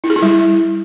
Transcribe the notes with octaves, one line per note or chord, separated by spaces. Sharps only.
E4
G#4
E4
G3